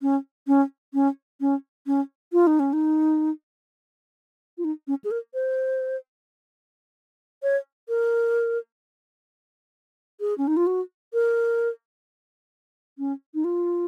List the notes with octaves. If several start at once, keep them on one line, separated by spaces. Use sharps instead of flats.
C#4
C#4
C#4
C#4
C#4
F4
D#4
C#4
D#4
F4
D#4
C#4
G#4
A#4
C5
C#5
A#4
G#4
C#4
D#4
F4
F#4
A#4
C#4
D#4
F4